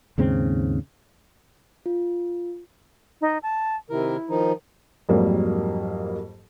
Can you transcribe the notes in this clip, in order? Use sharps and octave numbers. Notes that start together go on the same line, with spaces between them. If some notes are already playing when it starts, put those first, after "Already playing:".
D#2 G#2 C#3 C4
F4
D#4
A5
C3 D#3 E4 A#4
D#3 F3 D#4
F2 G#2 F#3 G3 A#3